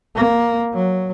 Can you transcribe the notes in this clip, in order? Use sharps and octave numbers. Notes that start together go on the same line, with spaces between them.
A#3
F#3